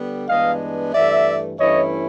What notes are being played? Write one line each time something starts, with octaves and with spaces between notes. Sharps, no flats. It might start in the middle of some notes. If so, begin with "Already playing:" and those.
Already playing: D3 G3 B3
G2 E3 G#3 B3 D4 D#5 F5
G2 E3 A3 D5 E5
G2 E3 A3 C#4 E4 C#5 D#5